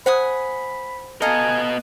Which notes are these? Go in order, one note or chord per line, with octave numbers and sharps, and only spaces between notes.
C5 F#5 G#5 B5 D#6
B3 A4 D#5 F5 G#5 A#5